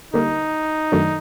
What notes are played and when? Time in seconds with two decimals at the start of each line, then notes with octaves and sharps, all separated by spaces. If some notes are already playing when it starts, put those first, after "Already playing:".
0.14 D3 G3 A#3 D#4
0.92 F#2 D#3 F#3 A3 D4